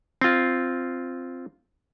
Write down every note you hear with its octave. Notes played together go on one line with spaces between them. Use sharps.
C4 F4